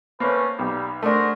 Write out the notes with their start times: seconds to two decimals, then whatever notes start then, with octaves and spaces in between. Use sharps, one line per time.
0.20 A3 A#3 C#4 B4 C5
0.59 B1 G3 A#3 G4
1.03 A3 D4 F#4 G#4 A#4 C5